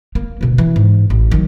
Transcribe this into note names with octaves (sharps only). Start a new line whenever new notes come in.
A#3
D2 B2
E3
G#2
A1
D#3 F#3